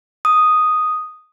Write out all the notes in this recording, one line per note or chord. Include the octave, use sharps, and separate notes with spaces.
D#6